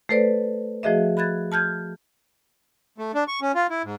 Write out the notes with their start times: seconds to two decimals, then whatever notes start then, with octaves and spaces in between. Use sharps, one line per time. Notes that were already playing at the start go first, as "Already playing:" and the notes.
0.09 A3 A4 B4 C5 D5
0.83 F3 A3 F#4 G#4 D#5 E5
1.17 B5 F#6 G#6 A6
1.52 A5 F6 G6 G#6
2.98 A3
3.15 D4
3.28 C#6
3.42 C#4
3.55 F4
3.70 E4
3.84 G#2